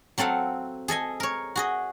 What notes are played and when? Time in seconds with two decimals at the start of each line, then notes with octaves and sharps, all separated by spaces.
0.18 F#3 C4 A4 F5 F#5
0.88 G#4 A4 D#5 G#5
1.20 A#4 C#5
1.56 F#4 G#4 D#5